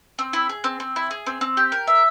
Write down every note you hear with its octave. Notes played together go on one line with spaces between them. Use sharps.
C4
E4
G#4
C4
C4
E4
G#4
C4
C4
G4
A#4
E5